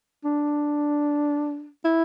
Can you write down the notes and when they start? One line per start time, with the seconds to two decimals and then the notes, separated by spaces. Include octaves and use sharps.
0.25 D4
1.85 E4